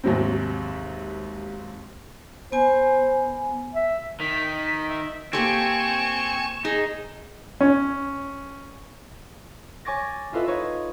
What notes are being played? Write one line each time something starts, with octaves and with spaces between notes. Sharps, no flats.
D#2 G#2 C3 F#3 C4
B3 C5 G#5
E5
D#3 B6
E5
A#3 C4 G4 A4 G#5 C#6 E7
D#4 G#4
C#4
C#5 G#5 C#6 D6 A6 A#6
E4 F4 A4 B4 D#5 E5
D#4 B4 C#5 D#5